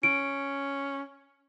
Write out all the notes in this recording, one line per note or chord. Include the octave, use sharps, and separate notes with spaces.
C#4 D7